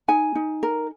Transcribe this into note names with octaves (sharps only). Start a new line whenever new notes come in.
D#4 G#5
D#4
A#4